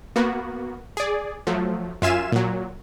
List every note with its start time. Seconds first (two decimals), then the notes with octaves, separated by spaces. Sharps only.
0.16 A#3 B3 F#4
0.97 G#4 D5
1.47 F3 F#3 A3
2.02 F#2 F4 E5 F5 G#5 E7
2.32 A#2 F#3